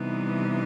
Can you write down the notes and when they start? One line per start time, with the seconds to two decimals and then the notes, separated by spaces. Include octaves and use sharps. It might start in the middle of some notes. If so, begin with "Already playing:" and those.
Already playing: C3 E3 G3 B3 D#4